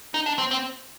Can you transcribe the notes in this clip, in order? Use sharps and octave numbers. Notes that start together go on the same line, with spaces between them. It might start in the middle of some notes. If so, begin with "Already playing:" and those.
D#4
D4
C4
C4